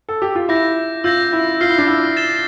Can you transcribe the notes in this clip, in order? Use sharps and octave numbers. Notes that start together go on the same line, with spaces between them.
A4
G4
F4
E4 D6 G6 A#6
F4 E6 G6 A#6
E4
F4 F6 C7 G7
E4
D4
E4
A6 E7 G7